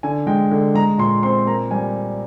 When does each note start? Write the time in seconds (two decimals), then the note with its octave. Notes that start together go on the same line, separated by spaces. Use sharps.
0.03 D3 G#5
0.27 G#3 G5
0.51 D3
0.75 G#3 A#5
0.98 A#2 C6
1.23 C4 C6
1.47 A#3 A#5
1.71 G3 G#5